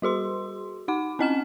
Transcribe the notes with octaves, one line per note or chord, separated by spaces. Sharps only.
G3 F#4 G#4 C6
D#4 F#5 D6
C4 C#4 D#5 A#5 F6 E7